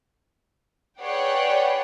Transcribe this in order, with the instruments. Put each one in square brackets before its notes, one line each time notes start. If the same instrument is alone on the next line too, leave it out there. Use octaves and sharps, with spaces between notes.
[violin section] G#4 B4 C#5 D5 F#5 G5